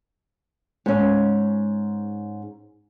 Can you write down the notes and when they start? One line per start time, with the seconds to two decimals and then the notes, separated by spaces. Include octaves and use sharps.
0.86 G#2 C#4